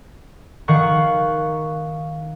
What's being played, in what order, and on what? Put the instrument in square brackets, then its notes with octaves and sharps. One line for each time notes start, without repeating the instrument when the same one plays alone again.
[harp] D#3 F5 F#5 A#5 C#6